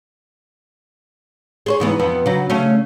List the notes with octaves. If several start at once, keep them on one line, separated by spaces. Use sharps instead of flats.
G#4 C5 C#5
G#2 E3 B3
F2 B3 E5
C#3 F#3
C#3 A3 C#4